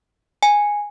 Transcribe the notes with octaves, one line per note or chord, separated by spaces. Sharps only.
G#5